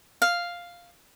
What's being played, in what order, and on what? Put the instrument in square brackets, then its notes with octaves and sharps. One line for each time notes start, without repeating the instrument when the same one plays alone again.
[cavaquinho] F5